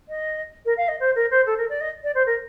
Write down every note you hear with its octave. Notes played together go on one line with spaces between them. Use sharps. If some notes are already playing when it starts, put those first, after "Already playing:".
D#5
A#4
F5
D#5
C5
A#4
C5
A4
A#4
D5
D#5
D5
C5
A#4